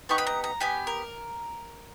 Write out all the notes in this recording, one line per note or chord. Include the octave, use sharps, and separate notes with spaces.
B3 D#4 G4 C#6
B5
A#5
A#5
B3 G4 G#5
A#4